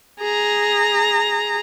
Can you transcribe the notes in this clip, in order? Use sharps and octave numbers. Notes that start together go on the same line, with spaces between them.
G#4 A#5